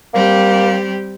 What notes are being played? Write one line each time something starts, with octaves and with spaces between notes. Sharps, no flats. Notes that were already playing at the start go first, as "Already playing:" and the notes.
G3 A#3 C4 G4